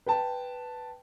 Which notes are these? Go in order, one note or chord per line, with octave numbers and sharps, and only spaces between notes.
B4 G5 A5